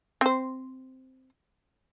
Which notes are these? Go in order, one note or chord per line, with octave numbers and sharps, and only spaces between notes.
C4 C5